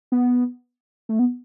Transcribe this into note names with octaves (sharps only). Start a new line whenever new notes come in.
B3
A3
B3